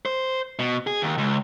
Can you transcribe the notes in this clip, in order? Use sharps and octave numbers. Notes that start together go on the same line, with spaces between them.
C5
B2
G#4
D#2
C#2